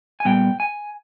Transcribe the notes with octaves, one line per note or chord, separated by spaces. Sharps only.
G#5
A#2 G3 B3 G5
G#5